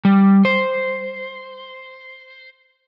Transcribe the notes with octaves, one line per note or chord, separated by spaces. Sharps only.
G3
C5